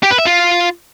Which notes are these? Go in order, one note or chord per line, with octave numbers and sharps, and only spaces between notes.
G4
B4
E5
F4